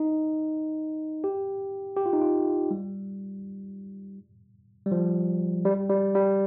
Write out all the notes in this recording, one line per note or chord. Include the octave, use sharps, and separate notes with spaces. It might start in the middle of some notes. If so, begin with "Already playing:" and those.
Already playing: D#4
G4
G4
F4
D#4
F4
G3
G3
F3
G3
G3
G3